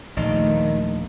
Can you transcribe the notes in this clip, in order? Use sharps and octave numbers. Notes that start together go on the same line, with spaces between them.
A#1 D#2 D#3 A3 F4 D5 D#5